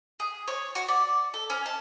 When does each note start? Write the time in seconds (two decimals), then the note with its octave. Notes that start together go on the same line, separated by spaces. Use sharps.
0.20 G#4
0.48 C#5
0.75 F#4
0.88 D5
1.34 A4
1.50 C#4
1.66 A5